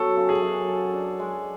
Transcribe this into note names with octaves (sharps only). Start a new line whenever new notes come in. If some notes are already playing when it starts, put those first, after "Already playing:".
Already playing: F#3 B3 A4
C#3
G#4
F#2
A4
D4
G#3